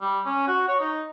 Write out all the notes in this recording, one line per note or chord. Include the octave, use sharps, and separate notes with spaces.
G3
C#4
F#4
C#5
D#4